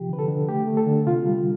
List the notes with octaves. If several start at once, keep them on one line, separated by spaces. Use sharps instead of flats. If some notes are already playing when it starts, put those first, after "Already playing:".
Already playing: C3 F3 G4
D3 B4
A4
D3
A3 G4
A3
A4
D3
C3 F4
G3